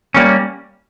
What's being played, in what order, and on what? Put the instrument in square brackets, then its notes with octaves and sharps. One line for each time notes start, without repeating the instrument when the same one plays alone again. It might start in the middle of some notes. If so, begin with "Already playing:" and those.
[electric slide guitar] G3 A#3 C#4